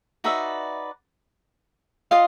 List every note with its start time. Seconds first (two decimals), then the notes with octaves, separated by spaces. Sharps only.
0.24 D#4 F#4 B4 D5 E5
2.11 F4 D#5 F5